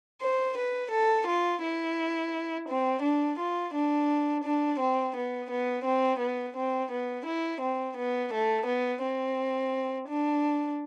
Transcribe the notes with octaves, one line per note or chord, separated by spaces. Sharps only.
C5
B4
A4
F4
E4
C4
D4
F4
D4
D4
C4
B3
B3
C4
B3
C4
B3
E4
C4
B3
A3
B3
C4
D4